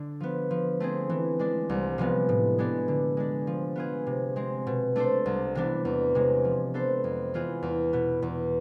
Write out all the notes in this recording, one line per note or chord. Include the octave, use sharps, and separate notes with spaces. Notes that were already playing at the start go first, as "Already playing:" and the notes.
Already playing: D3 D4
F3 B3
F3
A3 C4 G#4
E3
G#3 D4
C2
C3 F3 G#3 B3
A2
G#3 B3 D4
D3
G#3 D4
F3
B3 F4 G#4
C3
G#3 C4
B2
A3 D4 A4 C5
C2
C3 E3 B3 D4
E2
C3 G#3
F3
B3 D4 A4 C5
F2
E3 B3 F4 G#4
E2
B2 B3
E2